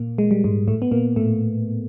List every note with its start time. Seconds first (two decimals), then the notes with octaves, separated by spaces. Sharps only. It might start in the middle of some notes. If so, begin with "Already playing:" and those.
Already playing: A#2 A#3
0.18 G#3
0.31 G3
0.44 G#2 G#3
0.68 A2 A3
0.82 B3
0.92 A#2 A#3
1.16 A2 A3